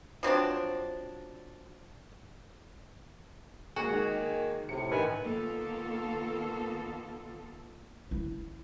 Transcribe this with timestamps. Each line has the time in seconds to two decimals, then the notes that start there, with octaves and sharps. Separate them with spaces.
0.23 F3 F#3 C4 D4
3.76 G#3 A#3 F#4 G#4
3.92 D#3
4.69 A2 C3 C#7
4.91 A1 D#3 B4 G#5
5.22 D#3 A#3 B3 F4 A4
8.11 E4